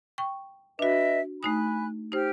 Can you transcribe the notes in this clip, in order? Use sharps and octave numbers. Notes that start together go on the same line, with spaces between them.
G5 C#6
D4 F#4 B4 D#5 E5
A3 D#4 G#5 B5 D#6 F#6
D#4 G4 C5 F6